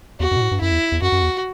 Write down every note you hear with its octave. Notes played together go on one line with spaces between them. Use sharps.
E2 F#4
F#2
B2
A2
G2
F#2 E4
E2
E2
F#2 F#4
F#2
E2